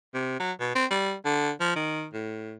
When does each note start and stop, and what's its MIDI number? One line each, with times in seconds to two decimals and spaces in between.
0.14 0.40 48
0.40 0.52 54
0.60 0.71 47
0.75 0.86 60
0.91 1.14 55
1.25 1.51 50
1.60 1.74 53
1.76 2.07 51
2.13 2.57 45